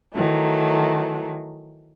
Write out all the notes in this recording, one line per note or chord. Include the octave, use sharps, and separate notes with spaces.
D#3 E3 F#3 A3